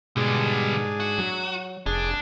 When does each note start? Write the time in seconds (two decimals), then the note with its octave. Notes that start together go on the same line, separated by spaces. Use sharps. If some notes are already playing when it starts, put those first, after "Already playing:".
0.17 G#2 B2 D3 G3 D4 G#4
1.00 F#4
1.18 F#3
1.86 F1 D4 G#4